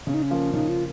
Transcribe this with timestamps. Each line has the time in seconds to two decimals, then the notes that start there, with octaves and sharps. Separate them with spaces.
0.07 C#3 C#4
0.14 D#4
0.22 C#4
0.31 F3 A#3 F4
0.54 C#3 D#4
0.69 F4